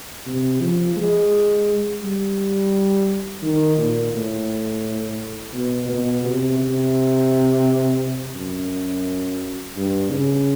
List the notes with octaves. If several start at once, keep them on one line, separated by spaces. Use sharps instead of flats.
C3
F3
G#3
G3
D#3
A#2
A2
B2
B2
C3
C3
F#2
G2
C#3